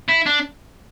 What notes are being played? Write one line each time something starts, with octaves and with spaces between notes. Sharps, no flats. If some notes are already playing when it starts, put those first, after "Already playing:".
E4
D4